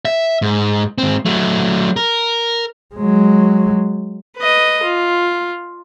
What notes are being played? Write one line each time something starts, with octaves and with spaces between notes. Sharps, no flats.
E5
G#2
G#2 C4
F#3 A3
A#4
F#3 G#3
B4 D#5
F4